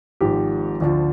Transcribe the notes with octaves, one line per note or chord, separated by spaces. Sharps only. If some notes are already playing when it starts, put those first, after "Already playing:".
G#1 G#2 F3 G4
D2 D3 F3